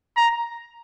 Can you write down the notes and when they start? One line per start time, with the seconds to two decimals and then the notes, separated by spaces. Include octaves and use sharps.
0.17 A#5